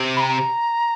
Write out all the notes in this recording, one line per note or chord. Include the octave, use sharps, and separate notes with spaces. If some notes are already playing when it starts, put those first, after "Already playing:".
Already playing: C3
B5
A#5